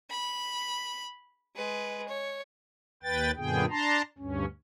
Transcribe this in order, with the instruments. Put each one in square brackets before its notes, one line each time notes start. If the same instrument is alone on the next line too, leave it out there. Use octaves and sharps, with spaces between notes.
[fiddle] B5
G#3 B4
C#5
[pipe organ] D#2 B4 G5 A6
F#2 A#2 D3 B3 G#4 G5
D4 A5 A#5 C6
D2 G2 C#4